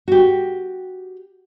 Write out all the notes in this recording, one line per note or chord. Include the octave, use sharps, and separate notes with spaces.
F#4 G4